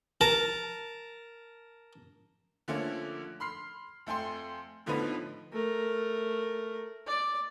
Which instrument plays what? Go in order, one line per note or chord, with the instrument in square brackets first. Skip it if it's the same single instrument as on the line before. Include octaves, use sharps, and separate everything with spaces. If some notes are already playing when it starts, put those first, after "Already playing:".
[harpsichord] A#4 A5
[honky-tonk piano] D3 F3 A3 A#3 C#4
B5 C6 F6 C7
F2 A3 G5 G#5 C6
A2 D3 F3 B3 D#4 B4
[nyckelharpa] A3 A#4
D5